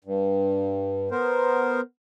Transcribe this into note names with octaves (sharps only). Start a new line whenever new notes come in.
G2
B3 A#4 C5